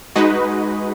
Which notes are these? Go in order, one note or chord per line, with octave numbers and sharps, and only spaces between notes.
G#3 D#4 F#4 B4 D#5